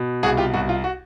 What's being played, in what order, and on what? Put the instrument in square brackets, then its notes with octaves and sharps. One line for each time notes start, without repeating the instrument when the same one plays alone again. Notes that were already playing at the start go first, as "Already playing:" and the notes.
Already playing: [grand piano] B2
C2 F#4 G#4
F4 G4
C2 F#4
F4
F#4